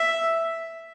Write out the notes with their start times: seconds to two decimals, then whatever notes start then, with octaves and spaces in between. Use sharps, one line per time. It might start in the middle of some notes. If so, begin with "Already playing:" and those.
Already playing: E5